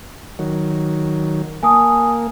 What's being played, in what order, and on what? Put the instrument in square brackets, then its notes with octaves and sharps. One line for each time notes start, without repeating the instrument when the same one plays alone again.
[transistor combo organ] D#3 F#3
[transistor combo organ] A#3 [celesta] G#5 A5 D#6